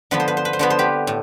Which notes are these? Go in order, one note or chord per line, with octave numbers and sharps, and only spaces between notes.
D3 F3 B3 B4
C5
B4
C5
B4
C5
D3 F3 B3 B4
C5
G4 B4
A2